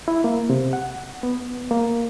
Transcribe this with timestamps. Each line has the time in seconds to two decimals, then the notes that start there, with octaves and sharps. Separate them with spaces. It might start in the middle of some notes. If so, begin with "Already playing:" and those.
0.08 E4
0.24 A#3
0.50 C3
0.73 F#5
1.23 B3
1.71 A#3